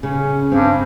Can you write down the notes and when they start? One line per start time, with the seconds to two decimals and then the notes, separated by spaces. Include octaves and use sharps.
0.03 C#3 C#4
0.52 G2 C4